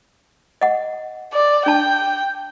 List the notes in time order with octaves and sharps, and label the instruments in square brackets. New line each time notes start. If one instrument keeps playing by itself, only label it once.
[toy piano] D#5 F#5
[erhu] D5
[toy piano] D4 A5 [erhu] G5